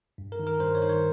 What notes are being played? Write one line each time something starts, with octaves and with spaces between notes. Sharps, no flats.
G2
A#4
D#3
A#4
G2 C5
C#5
D#3 C5
C#5